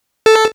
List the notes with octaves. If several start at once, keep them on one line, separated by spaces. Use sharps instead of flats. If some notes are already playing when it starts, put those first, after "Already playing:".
A4